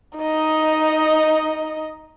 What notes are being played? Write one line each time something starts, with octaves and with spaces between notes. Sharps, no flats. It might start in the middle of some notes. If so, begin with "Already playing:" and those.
D#4 D#5